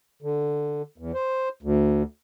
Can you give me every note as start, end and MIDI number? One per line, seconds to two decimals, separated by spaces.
0.22 0.82 50
0.98 1.12 40
1.14 1.49 72
1.62 2.03 38